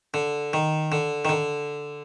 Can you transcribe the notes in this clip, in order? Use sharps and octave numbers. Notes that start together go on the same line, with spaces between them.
D3
D#3
D3
D#3
D3